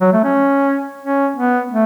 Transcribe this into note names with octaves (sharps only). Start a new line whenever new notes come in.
F#3
A3
C#4
C#4
B3
A3